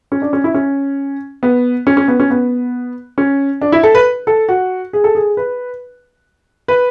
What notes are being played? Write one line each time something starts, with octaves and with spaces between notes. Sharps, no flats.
C#4
D4
C#4
E4
C#4
B3
C#4
C#4
B3
C#4
B3
C#4
D4
E4
A4
B4
A4
F#4
G#4
A4
G#4
B4
B4